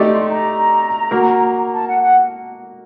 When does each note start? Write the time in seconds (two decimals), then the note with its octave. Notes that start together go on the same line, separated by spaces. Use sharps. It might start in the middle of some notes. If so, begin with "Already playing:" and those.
Already playing: A3 D#4 G4 D5
0.10 C6
0.30 A#5
1.11 A#3 F#4 A#4
1.72 A5
1.88 F#5
2.02 F#5